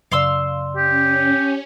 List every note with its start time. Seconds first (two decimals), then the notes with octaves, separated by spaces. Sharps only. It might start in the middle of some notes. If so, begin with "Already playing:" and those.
0.12 F#2 C#3 D5 F5 C6 E6
0.76 C#4 G4